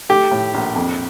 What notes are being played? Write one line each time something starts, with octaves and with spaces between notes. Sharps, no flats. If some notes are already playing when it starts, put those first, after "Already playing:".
A3 G4
A2
A#1
F2